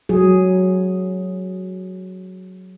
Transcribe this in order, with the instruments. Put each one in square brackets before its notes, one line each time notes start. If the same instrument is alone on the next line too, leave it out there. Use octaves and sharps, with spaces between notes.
[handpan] F#3 G#4